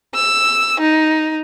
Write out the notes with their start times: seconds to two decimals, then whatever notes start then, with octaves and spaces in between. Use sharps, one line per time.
0.15 E6
0.80 D#4